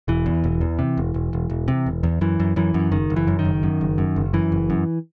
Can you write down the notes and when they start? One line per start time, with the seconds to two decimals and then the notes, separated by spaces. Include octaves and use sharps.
0.08 E1 E3
0.26 E2
0.44 E1
0.61 E2
0.79 C3
0.97 E1
1.14 E1
1.33 E1
1.50 E1
1.68 C3
1.86 E1
2.03 E2
2.21 F#2 E3
2.40 F#2
2.56 F#2 E3
2.74 F#2
2.91 F#1 D#3
3.10 F#1
3.16 E3
3.27 F#2
3.39 D#3
3.45 F#1
3.63 F#2
3.81 F#1
3.98 F#2
4.16 F#1
4.33 F#2 E3
4.52 F#1
4.70 F#2